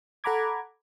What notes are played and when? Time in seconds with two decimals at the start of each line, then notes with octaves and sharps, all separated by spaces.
0.24 A4 F#5 A#5 B5 D6 G#6